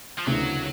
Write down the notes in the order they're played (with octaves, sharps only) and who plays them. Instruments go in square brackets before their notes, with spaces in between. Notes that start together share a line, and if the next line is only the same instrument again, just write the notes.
[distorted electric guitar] F3
[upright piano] D2 C#3 E3 A3 [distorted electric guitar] F#3